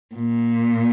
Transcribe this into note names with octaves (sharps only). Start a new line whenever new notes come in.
A#2